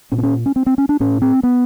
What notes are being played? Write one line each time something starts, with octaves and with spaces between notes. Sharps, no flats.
A#2 C#4
C4
C#4
C#4
C4
C4
C#4
D4
A2 C#4
C4
B3